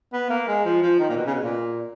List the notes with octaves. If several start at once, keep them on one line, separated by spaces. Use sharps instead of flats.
B3
A#3
G#3
F3
F3
D#3
A#2
B2
C#3
B2
A#2